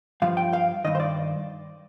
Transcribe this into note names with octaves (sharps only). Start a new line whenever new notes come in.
G2 F3 F5
G5
F5
G2 D#3 D#5
C5
D5